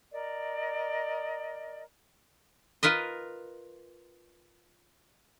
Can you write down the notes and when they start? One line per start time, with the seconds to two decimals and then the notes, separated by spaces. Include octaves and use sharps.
0.12 A#4 D5 D#5
2.83 F4 A#4 B4 D#5